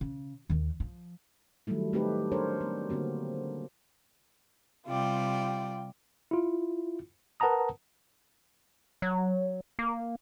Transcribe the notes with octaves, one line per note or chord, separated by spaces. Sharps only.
C#3
D#2 D#3
F3
D#3 F#3 G3 A3 E4
A3 C4 D#4 G4 A4 B4
D4 A#4 C5 C#5
A3 B3
D3 A#3 C4 F#4
C3 G3 F4 D5 G5
E4 F4
A#4 B4 F#5 A5 A#5 D#6
F#3
A#3